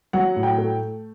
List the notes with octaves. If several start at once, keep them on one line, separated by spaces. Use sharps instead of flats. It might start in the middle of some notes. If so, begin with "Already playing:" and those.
F#3 F#5
A2
G5
A3